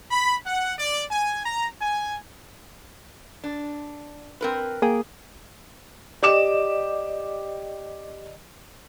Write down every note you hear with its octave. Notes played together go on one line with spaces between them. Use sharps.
B5
F#5
D5
G#5
A#5
G#5
D4
C4 A#4 B4
A#3 G#4 G5 D#6
G4 D5 D#5 D6 E7